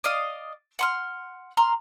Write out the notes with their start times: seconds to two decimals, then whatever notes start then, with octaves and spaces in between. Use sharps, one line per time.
0.04 D5 D#5 F5 D#6
0.79 F#5 C6 F6
1.57 A#5 C6 F6